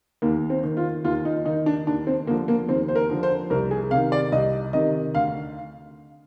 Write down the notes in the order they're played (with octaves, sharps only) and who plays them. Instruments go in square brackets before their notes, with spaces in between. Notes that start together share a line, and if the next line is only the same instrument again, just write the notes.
[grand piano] D#2 A#3
C4
D#3
F4
D#2 F4
D#4
D#3 D#4
D4
D#2 D4
C4
D3 A#3
F3
A#3
D#2 C4
C5
A#4
D3 F3
C5
C2 A#4
G#4
C3 D#3 F5
D5
C2 D#5
C3 D#3 D#5
D2 F5